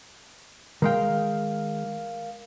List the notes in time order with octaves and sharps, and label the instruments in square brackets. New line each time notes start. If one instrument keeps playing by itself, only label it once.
[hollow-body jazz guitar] D#3 G#3 G5 [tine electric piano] A#4 F5